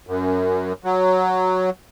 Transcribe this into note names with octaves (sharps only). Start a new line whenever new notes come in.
F#2
F#3